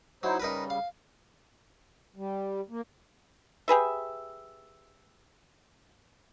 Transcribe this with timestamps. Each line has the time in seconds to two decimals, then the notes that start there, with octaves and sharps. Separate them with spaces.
0.23 F#3 D#4 E4 C5
0.40 C#3 G3 D#4 A#4 B4
0.70 F5
2.16 G3
2.70 A#3
3.68 G4 G#4 B4 E5